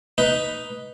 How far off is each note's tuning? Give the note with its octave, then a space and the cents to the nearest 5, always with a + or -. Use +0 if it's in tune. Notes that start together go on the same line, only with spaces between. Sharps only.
D#4 +0 B4 +0